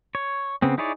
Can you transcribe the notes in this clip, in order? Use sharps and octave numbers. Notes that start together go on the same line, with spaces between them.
C#5
C#3 B3 C4
D#4 E4 G#4 C#5 D5